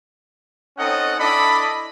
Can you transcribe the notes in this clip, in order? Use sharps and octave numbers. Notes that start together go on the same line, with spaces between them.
C4 C#4 D#4 A4 D#5 F#5
D4 E4 A4 D5 D#5 B5